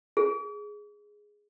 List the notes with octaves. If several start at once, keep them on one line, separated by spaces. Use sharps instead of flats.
G#4